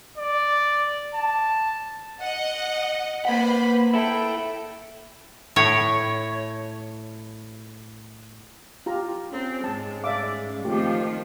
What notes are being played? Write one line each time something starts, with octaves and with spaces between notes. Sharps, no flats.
D5
A5
D#5 F#5
A#3 B4 C5 F#5 B5
E4 A4 G5
A2 C#5
F4 G4 A#5
C4 C#4
G#2 G#3 A5
D5 E5 F5 D6
D#3 F3 A3 C4 F4 G4